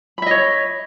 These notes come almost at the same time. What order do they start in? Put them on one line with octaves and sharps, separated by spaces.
B5 E5 D#5 C#5